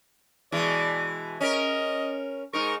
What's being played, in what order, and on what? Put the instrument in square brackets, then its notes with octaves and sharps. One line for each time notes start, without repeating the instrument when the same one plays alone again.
[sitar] B2 E3 G#3 [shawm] D5
[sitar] C#4 A#4 [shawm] D#5
[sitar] G#2 D#4 A#4 [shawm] C#6